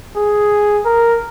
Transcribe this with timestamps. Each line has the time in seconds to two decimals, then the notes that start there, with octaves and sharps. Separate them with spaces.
0.16 G#4
0.85 A#4